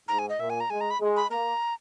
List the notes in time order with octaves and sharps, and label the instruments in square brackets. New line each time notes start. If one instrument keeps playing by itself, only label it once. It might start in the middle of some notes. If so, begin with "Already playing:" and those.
[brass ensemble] G#2 [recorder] A#5
[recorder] G#5
D#5
[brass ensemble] A#2 [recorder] E5
[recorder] G#5
A#5
[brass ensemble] G#3 [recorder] G#5
[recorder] A#5
B5
[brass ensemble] G#3
[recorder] B5
[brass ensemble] A#3 [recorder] A#5